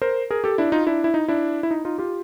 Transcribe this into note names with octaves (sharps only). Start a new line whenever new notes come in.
A#4 C5
G#4 A#4
G4 A4
D4 E4
D#4 F4
D4 E4
E4
D#4
D4 E4
E4
D#4
D#4 F4
F4 G4